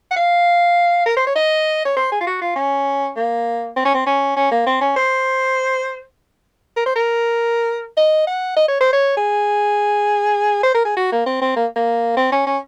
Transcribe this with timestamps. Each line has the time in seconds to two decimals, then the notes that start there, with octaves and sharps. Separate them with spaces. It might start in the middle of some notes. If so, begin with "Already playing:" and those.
0.11 F#5
0.16 F5
1.06 A#4
1.17 C5
1.27 C#5
1.35 D#5
1.85 C#5
1.96 C5
2.12 G#4
2.21 F4
2.27 F#4
2.42 F4
2.56 C#4
3.16 A#3
3.76 C4
3.85 C#4
3.95 C4
4.06 C#4
4.37 C#4
4.51 A#3
4.66 C4
4.81 C#4
4.96 C5
6.76 A#4
6.86 C5
6.96 A#4
7.97 D#5
8.27 F#5
8.56 D#5
8.68 C#5
8.80 C5
8.93 C#5
9.17 G#4
10.63 C5
10.75 A#4
10.85 G#4
10.97 F#4
11.12 A#3
11.26 C4
11.42 C4
11.56 A#3
11.76 A#3
12.17 C4
12.32 C#4
12.47 C#4